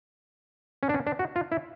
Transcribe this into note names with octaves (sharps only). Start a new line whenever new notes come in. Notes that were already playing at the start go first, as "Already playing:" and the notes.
C#4
D4
C#4
D4
F#4
F4
E4